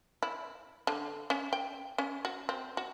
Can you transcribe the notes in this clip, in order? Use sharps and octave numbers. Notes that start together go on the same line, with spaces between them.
E4
D3
C#4
G5
C#4
F#4
C4
F#4